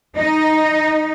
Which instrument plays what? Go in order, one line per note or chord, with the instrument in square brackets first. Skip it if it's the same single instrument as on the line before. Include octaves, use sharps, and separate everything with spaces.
[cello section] D#4